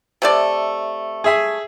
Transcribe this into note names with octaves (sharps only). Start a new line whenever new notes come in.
C3 A3 D5
G#4 E5 G#5